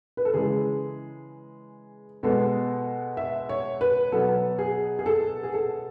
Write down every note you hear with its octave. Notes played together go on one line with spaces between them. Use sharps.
B4
A4
C#3 E3 G#3 G#4
B2 G#3 B3 A4
E5
C#5
B4
B2 F#3 B3 A4
G#4
G#4
A4
G#4
A4